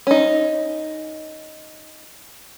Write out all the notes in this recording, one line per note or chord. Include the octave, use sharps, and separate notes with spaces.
C#4 D#4